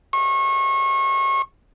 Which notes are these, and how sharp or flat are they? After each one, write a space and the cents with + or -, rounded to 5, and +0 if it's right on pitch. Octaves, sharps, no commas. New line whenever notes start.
C#6 -30